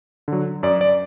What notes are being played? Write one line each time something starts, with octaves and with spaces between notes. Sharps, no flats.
D3 F#3
F#2 D5
D5